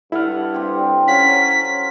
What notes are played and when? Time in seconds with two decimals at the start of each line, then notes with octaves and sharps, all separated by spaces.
0.12 G2 E4 A4 F#5 A5 F6
0.54 C4 G4
1.08 F#3 C#4 F5 F#5 B6